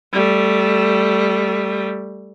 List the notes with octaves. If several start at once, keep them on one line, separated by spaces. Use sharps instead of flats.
G3 A3